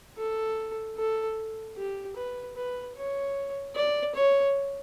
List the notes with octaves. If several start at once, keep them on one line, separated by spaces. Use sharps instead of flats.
A4
A4
G4
B4
B4
C#5
D5
C#5